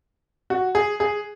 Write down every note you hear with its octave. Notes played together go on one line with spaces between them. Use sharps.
F#4
G#4
G#4